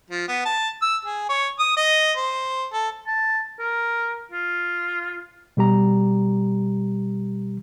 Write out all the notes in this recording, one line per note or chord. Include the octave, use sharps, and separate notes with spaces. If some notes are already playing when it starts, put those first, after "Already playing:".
F3
B3
A5
E6
G#4
C#5
D#6
D#5
C5
A4
A5
A#4
F4
B2 G3 G4 A#5